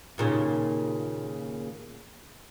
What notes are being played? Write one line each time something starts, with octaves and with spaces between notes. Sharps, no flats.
D#2 A#2 C#3